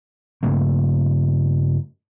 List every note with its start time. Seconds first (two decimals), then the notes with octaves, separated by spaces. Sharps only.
0.43 G2 C#3 A3 A#3